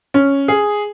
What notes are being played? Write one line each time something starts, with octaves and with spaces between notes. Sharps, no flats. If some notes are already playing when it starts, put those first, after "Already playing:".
C#4
G#4